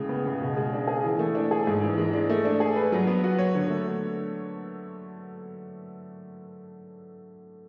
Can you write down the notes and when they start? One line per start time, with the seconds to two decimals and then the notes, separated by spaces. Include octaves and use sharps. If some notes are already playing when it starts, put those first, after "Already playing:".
Already playing: A2 C#3 G#3
0.09 B3
0.26 C#3
0.41 B2
0.57 G#3
0.73 D4
0.88 G#4
1.04 E3
1.19 A3
1.35 D4
1.51 G#4
1.67 G#2
1.82 E3
1.98 G#3
2.13 D4
2.30 A3
2.45 D4
2.60 G#4
2.76 B4
2.92 F#3
3.07 B3
3.24 F#4
3.39 C#5
3.55 D3
3.70 A3